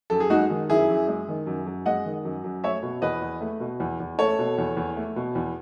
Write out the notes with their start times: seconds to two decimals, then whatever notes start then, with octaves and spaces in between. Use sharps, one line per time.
0.10 F#2 A4
0.20 G#4
0.30 G#3 D#4 F#4
0.50 D#3
0.70 F#2 E4 G#4
0.89 F#2
1.08 G#3
1.28 D#3
1.47 F#2
1.66 F#2
1.86 G#3 D#5 F#5
2.05 D#3
2.25 F#2
2.44 F#2
2.63 A3 C#5 E5
2.83 B2
3.02 E2 B4 D#5
3.21 E2
3.41 A3
3.60 B2
3.80 E2
4.00 E2
4.19 A3 A4 C#5
4.39 B2
4.58 E2
4.77 E2
4.96 A3
5.16 B2
5.35 E2